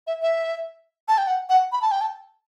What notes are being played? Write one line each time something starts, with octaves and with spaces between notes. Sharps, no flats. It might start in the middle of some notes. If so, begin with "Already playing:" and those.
E5
E5
A5
G5
F#5
F#5
B5
A5
G5
A5